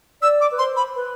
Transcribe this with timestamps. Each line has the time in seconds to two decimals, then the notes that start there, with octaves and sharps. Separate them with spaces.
0.22 D5 E6
0.41 D6
0.51 B4
0.58 C5 C6
0.76 B5
0.95 B4